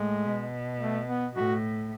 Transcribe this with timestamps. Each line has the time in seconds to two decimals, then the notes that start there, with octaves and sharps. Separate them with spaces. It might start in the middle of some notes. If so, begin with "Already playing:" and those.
Already playing: A2 G#3
0.26 B2
0.80 A3
1.08 B3
1.35 A2 F#4